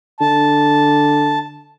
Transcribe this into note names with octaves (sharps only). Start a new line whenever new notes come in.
D3 A5